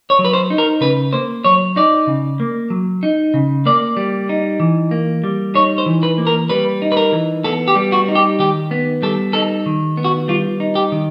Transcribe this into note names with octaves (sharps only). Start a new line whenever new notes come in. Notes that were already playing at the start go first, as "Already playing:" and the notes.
C#5
F#3
B4
C5
D#4
A#4
C#3 B4
A#3 C5
F#3 C#5
D#4 D5
C#3
A#3
F#3
D#4
C#3
A#3 D5
G3
D#4
E3
A#3
G3
D#4 C#5
C5
E3
B4
A#3
A#4
G3 B4
D#4
B4
A#4
E3
B3 A4
G4
G3
F#4
D#4
G4
D#3 G4
B3
G3 A4
D#4 A4
D#3
B3
F#4
G3 F4
D#4
G4
D#3